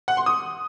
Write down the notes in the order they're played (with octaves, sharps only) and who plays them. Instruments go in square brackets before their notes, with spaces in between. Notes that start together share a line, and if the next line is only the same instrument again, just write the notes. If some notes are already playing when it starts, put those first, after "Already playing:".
[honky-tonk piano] F#5
C6
D#6